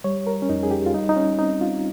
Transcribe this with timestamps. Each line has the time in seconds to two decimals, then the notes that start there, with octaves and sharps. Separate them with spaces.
0.04 G3 C#5
0.27 A#4
0.42 C#4
0.49 F2 D#4
0.63 G#4
0.71 G4
0.86 F4
0.94 G3 D#4
1.09 D#4
1.16 C#4
1.39 C4 D#4
1.61 F4